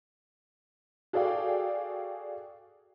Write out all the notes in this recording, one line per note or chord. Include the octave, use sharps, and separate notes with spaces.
F#4 G#4 A4 D5 F5 G5